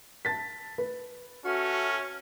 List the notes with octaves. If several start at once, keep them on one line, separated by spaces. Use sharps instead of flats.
A5 A6 B6
B4
C#4 F#4 A4 E5 F6